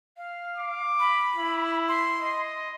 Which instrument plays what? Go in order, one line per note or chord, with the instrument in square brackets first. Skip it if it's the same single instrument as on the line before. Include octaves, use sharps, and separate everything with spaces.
[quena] F5
[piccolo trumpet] D6
[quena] B5
[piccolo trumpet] E4
[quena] C6
[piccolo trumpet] D#5